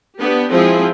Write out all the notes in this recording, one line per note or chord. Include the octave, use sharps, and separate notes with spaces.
B3 D4 G4
F3 G#3 C4 E4 G#4